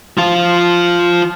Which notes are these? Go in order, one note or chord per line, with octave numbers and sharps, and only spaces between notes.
F3 F4